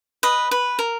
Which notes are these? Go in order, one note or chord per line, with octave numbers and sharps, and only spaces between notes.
B4 D#5
B4
A#4